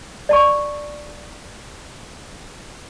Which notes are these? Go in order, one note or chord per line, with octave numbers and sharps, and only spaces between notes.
D5 A5 C#6